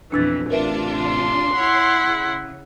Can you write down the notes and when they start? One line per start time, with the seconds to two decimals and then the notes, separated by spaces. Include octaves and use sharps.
0.12 B1 F2 E3 D4 E6 A6
0.50 A1 C3 D4 F4 A#4 B4 E5
0.98 C6
1.55 E4 C#5 F#5
2.04 C#3